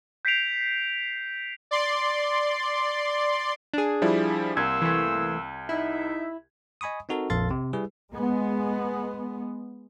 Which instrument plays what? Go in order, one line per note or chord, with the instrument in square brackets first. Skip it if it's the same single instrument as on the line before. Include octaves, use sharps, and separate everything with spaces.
[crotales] G6 B6 C7 D7 F7
[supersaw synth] D5 C6
[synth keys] D4 G#4
[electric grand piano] F3 G3 E4
[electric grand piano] C2 G#6 [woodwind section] A#3 C6 E6
[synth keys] E3 A3
[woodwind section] D#4 E5 [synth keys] E4
[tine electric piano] D#5 G#5 B5 C#6 D#6
C4 D#4 F#4 A4 A#4
A#1 F2 A4 F5 C6 A6
C3
G3 E4 G#4 B4
[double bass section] G#3 B3